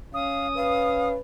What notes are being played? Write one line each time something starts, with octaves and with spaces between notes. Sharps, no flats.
C#4 F5 D#6
B4 F5